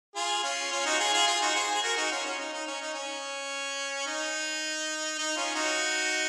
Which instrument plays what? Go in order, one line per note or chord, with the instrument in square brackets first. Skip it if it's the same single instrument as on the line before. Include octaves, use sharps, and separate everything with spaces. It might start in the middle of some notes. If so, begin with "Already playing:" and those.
[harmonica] F4 G#4
C#4 F4
C#4 F4
D#4 F#4
F4 G#4
F4 G#4
F4 G#4
D#4 F#4
G#4 C5
G#4
F#4 A#4
D#4 F#4
C#4 F4
C#4
D#4
D#4
C#4
D#4
C#4
D#4
D#4
C#4 F4
D#4 F#4